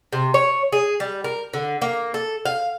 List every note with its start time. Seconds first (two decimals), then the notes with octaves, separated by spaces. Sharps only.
0.13 C3
0.34 C#5
0.73 G#4
1.00 G3
1.24 A#4
1.54 D3
1.82 A#3
2.14 A4
2.46 F5